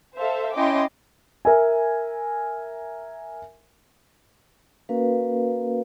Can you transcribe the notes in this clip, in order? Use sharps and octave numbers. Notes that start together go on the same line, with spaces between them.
A4 C5 E5 F5
C#4 E4 D#5 G5 C6 D6
A#4 E5 G#5
A#3 C#4 F#4 A#4 B4 F5